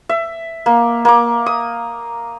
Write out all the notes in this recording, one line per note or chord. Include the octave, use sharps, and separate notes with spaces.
E5
A#3
A#3 D6
D#6